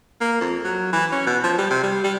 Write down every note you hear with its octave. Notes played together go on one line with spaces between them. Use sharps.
A#3
F2
F#3
E3
C#4
B2
F3
G3
C3
G3
G3